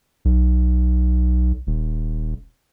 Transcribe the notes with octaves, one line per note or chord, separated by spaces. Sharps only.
B1
D#1